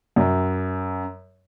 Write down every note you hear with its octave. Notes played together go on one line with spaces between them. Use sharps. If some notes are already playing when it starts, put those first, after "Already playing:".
F#2